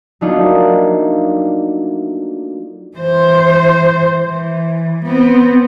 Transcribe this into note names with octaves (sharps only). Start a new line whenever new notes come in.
F#3 A3 A#3 D4 D#4 F4
E3 C5
E3
B3 C4